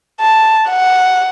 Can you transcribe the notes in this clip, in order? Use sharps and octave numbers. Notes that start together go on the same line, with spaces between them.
A5
F#5